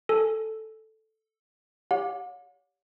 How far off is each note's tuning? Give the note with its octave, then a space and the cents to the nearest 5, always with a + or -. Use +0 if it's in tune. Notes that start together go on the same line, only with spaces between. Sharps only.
A4 +0 G#5 +0
G4 +0 C#5 +35 F#5 -45